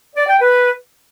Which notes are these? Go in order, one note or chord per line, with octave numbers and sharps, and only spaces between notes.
D5
G5
B4